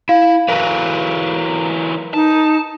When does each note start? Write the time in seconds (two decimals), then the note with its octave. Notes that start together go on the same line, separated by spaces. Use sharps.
0.09 E4 F5
0.48 E3 F#3 A#4 B4
2.14 D#4 A5